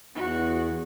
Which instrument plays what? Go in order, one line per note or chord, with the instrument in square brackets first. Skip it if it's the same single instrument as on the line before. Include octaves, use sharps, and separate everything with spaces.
[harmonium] E2 [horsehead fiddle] F#4